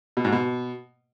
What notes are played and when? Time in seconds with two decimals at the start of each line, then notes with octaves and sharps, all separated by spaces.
0.17 B2
0.25 G#2
0.32 B2